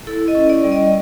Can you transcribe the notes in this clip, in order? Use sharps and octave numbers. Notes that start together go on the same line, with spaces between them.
E4 A4
D#5
C#4
D5
G3
D#5